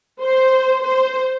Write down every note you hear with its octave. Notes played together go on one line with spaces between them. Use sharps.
C5
C5